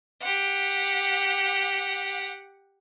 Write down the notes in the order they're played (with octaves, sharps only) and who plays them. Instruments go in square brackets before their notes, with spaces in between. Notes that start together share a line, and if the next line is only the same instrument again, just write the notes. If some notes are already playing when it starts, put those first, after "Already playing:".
[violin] G4 F#5